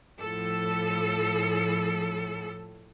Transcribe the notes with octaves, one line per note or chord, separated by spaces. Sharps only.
A2 F3 A4